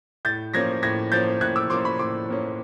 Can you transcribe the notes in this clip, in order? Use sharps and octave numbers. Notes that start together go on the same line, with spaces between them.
A2 G6 A6
F3 A#3 C#4 G#6 A#6
A2 G#6 A#6
F3 A#3 C#4 G6 A6
A2 F#6 G#6
D6 E6
F3 A#3 C#4 C6 D6
B5 C#6
A2 C6 D6
F3 A#3 C#4